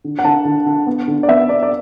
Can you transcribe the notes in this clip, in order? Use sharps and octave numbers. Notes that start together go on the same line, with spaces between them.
D3
F#5
D3 A5
D3
D3
B3
D3
D5
B3 E5
B3 D5
D5